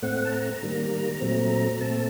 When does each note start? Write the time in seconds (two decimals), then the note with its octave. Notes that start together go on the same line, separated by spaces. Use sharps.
0.02 A2 A3 C4 F#5
0.25 A5
0.32 A#5
0.63 D#3 G3 A#3
1.20 A#2 F#3 A3 C4
1.81 A#2 A3 C4 A5